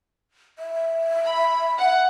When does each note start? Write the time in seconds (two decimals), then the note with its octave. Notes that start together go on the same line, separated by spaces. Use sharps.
0.59 E5
1.26 B5
1.78 F#5